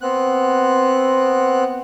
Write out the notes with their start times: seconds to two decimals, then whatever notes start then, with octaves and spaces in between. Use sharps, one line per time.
0.01 B3 C4 F#6